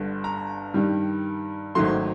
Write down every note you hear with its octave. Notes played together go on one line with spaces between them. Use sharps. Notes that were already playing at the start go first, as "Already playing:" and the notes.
Already playing: G1 G2 D3
A#5
G2 D#3 G3
G#1 G#2 D#3 F#3 A3 C6